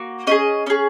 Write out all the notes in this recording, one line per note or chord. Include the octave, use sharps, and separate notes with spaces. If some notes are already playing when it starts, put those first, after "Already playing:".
Already playing: A#3 F#4
C#4 F4 G#4 D#5
C#4 G#4